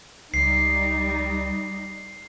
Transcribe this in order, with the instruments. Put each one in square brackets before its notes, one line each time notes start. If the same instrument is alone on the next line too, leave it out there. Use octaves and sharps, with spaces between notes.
[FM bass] C#2 [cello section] G3 D#4 [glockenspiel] C7